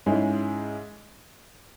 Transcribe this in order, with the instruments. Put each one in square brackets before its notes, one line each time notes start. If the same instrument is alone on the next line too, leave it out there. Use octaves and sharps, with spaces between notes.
[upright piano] G#2 G#3 C#4 E4 G#4